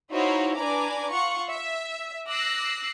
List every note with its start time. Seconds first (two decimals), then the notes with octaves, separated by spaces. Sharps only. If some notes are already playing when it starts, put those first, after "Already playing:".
0.12 D#4 E4 F#4 C5 C#5 F5
0.56 D4 B4 G#5 A#5 D6
1.11 F4 F#5 C#6
1.50 E5
2.28 D6 E6 F#6 A#6 C7